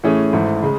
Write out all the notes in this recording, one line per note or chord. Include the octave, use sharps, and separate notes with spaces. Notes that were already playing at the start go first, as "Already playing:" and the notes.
A2 E3 A3 C#4 G#4
G#1 G#2 E3 A3
C#3 G#3